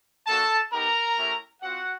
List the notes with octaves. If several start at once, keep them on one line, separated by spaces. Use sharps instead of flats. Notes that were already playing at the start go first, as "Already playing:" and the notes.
A#3 D4 F#4 A4 A5
B3 D#4 G4 A#4 A#5
A3 C#4 E4 G4
C4 F4 F#4 F#5